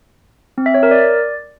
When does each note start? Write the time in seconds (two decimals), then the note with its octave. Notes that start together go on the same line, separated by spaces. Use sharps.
0.58 C4
0.66 E5
0.74 C#5
0.83 A#4
0.91 D5